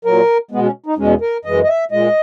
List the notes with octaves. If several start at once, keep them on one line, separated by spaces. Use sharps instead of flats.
A#2 F#3 A#4
B2 G#3 B3
C#4
D#4
E2 B2 G#3 C#4
A#4
F#2 E3 G#3 D#5
D#5
E5
A#2 G#3 D#5